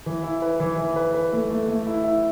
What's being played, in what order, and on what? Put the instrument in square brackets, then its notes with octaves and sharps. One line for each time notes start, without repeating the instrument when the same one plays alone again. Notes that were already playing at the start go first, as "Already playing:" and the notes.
[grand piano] E3
E4
B4
E3
E3
B4
B4
A3
A3
A3
E4
E4